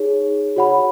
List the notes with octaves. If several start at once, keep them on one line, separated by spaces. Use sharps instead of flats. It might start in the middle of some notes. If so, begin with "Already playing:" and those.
Already playing: D#4 G#4 C#5
F#4 C#5 F#5 B5